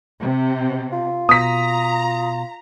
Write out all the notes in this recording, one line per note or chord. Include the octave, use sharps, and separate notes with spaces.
C3
F4
B2 A#5 D#6 B6